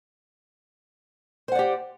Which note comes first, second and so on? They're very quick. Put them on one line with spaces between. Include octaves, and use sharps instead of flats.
C5 F#5 D5 G4